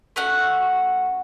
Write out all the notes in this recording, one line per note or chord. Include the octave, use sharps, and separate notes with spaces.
A3 C#4 F#4 F#5